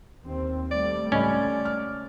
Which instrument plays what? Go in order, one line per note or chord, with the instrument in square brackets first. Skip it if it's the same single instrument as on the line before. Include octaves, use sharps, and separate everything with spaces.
[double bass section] D#2 C4
[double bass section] G3 A3 [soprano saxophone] D5
[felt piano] C#2 D#5 B5 [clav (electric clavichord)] C#4 [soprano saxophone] D5
[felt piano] F6